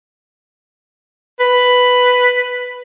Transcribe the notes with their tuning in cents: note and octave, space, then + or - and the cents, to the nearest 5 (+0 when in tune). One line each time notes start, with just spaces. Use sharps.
B4 +5